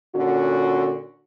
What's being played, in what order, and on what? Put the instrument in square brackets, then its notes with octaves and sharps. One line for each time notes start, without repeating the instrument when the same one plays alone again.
[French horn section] A#2 D3 C#4 F#4